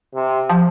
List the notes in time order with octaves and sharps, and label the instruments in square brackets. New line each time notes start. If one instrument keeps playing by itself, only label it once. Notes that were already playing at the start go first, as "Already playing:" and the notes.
[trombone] C3
[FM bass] F3